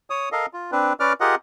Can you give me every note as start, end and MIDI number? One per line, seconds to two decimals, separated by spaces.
0.10 0.29 73
0.10 0.29 87
0.32 0.46 69
0.32 0.46 70
0.32 0.46 75
0.32 0.46 77
0.53 0.71 65
0.72 0.93 60
0.72 0.93 62
0.72 0.93 71
1.00 1.13 61
1.00 1.13 71
1.00 1.13 74
1.00 1.13 86
1.00 1.13 89
1.21 1.35 65
1.21 1.35 67
1.21 1.35 68
1.21 1.35 70
1.21 1.35 75
1.21 1.35 78